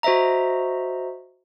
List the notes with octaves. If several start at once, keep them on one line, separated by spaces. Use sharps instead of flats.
F#4 C5 D#5 E5 A#5